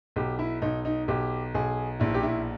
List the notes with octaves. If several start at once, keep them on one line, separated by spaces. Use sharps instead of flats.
B1 G4
E4
B1 D#4
D#4
B1 G4
B1 G#4
A#1 E4
G4
E4